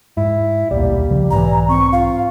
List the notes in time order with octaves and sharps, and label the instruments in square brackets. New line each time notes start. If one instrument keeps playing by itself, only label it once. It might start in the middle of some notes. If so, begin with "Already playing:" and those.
[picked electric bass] G#2 [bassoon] E4
[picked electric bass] D#1 B1 [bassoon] G3 [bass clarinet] A#3
[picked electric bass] C2 C#3 F3
[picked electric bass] B1 G#2 [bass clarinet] E3 [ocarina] A#5
[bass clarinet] C4 [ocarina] C#6
[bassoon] F4 [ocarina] F5